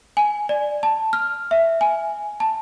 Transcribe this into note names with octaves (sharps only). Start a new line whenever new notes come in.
G#5
D5
A5
F6
E5
G#5
A5